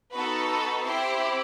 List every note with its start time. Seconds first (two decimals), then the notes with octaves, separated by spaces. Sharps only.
0.14 B3 D#4 F#4 A4 B4
0.50 B4
0.85 C4 E4 G4 C5